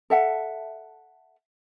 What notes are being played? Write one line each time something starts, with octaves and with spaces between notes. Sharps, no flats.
A4 E5 F#5